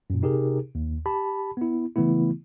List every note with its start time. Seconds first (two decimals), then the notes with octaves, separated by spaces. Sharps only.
0.10 F#2 A#2
0.22 C3 D#4 G4 G#4 A#4
0.75 D#2
1.06 G4 A5 B5
1.57 B3 E4
1.96 C#3 E3 A3 B3 E4